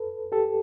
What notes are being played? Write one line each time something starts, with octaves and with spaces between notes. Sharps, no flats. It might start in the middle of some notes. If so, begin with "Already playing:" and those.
Already playing: A4 B4
G4 A4